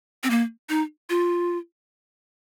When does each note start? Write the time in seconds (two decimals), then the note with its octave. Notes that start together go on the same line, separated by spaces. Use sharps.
0.24 C4
0.30 A#3
0.69 D#4
1.10 F4